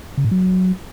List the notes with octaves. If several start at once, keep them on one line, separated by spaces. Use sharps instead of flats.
C#3
A2
F#3